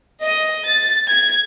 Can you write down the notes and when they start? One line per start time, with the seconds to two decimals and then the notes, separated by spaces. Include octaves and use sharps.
0.22 D#5
0.66 A6
1.10 G#6